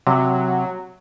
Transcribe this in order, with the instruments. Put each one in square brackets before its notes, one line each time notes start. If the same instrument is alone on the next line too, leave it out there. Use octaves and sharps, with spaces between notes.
[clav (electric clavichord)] C3 [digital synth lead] F#3